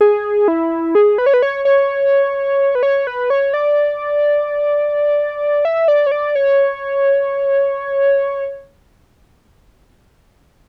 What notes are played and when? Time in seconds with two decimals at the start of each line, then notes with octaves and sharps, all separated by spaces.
0.01 G#4
0.48 E4
0.95 G#4
1.18 B4
1.26 C#5
1.34 B4
1.42 C#5
1.65 C#5
2.75 B4
2.83 C#5
3.07 B4
3.30 C#5
3.54 D5
5.65 E5
5.88 D5
6.06 C#5
6.12 D5
6.35 C#5